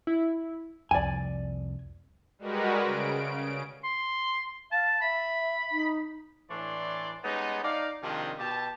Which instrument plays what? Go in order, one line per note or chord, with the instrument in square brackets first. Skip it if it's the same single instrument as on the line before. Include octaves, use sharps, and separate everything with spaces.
[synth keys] E4
[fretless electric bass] C2 F2 [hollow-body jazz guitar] D5 G#5
[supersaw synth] G3 G#3 F#4 A#4 B4
C#3 D7
[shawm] C6
[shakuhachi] F5 [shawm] A5
[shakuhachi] E5 [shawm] B5
[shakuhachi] D#4
[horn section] A2 E3 D4 C#5 D5 C6
G3 G#3 B3 C#4 D#4
D#4 D5 F5
C3 D#3 F3 G3 G#3 D4
B2 G4 A5